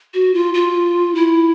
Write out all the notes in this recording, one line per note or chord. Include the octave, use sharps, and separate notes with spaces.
F#4
F4
F4
E4